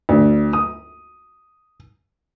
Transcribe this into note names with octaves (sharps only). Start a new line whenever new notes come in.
D2
D#6